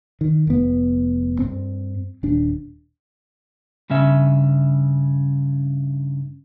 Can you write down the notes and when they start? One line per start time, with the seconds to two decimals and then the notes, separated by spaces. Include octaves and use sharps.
0.21 D#3
0.47 F1 B3
1.39 G2 C4
2.23 D#1 D4
3.90 G2 C#3 C#4 E5